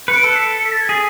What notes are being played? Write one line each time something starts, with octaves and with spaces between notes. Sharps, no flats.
B4 C#7
D7
A4 C#7
B6
C#7
B6
A6
G#6
G#4 B6